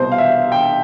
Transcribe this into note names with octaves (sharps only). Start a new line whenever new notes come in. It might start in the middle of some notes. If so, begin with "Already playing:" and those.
Already playing: C2 B2 C5
F5
E5
G5